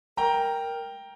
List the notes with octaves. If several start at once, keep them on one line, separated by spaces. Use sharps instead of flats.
A#4 G5 A#5